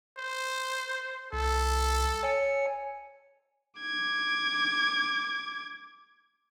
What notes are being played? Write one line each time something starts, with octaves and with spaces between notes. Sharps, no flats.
C5
C2 A4
C#5 G#5 C#7
D6 G#6